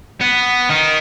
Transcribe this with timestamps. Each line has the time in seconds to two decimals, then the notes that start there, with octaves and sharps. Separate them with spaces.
0.21 B3
0.70 D#3 D#4